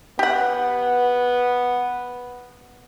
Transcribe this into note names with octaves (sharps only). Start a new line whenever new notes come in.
B3 G4 F#5